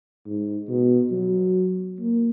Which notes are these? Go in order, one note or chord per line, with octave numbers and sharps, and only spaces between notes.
G#2
B2
F#3
A#3